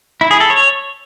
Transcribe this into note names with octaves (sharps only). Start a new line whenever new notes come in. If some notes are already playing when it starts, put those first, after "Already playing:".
E4
G#4
A4
C#5